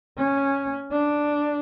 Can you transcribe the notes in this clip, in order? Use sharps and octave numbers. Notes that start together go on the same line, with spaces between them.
C#4
D4